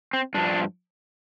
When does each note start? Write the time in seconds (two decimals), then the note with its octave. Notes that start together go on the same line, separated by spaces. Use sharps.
0.13 C4
0.34 G2 F3 D4